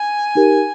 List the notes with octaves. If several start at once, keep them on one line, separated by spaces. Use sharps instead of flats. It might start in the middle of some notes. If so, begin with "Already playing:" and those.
Already playing: G#5
D#4 G4 A#4